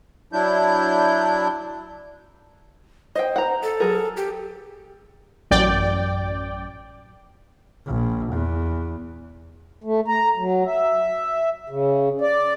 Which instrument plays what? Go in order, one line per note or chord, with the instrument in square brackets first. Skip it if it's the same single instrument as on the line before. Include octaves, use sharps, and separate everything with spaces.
[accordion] F#3 D4 E4 G6
[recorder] C5 [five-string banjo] D#5 G5
[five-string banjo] F#5 A#5
[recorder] A4
[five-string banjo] F#3 G#4 A#4
[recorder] G4
[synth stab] A1 F#2 D5 G5
[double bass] A#1
E2
[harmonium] A3
A#5
F#3
E5
C#3
D5